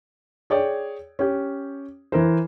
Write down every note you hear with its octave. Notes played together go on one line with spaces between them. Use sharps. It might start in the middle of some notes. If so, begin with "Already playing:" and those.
G#4 C#5 D5 G5
C#4 G4
E3 A#4 C5